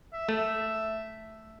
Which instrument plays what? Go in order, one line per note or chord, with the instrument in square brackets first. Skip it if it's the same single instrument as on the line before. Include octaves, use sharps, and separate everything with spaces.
[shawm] E5
[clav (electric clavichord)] A3